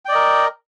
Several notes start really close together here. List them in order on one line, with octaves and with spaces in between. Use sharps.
G5 D5 D#5 A#4